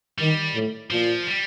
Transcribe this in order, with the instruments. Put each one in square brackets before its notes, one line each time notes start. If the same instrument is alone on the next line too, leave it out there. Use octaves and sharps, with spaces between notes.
[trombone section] D#3 [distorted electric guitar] G3
[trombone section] A2
[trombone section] A#2 [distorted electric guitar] F3
[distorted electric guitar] G3